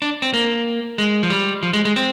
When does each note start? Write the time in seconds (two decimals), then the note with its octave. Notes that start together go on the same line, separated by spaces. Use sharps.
0.02 D4
0.22 C4
0.34 A#3
0.98 G#3
1.23 F3
1.30 G3
1.63 F3
1.73 G#3
1.85 G#3
1.96 C4